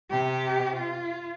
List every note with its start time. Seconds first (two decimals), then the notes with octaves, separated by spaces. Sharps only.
0.11 C3 G4
0.76 F4